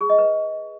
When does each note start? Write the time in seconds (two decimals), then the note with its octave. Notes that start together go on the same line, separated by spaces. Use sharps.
0.01 G#4
0.09 D#5
0.18 B4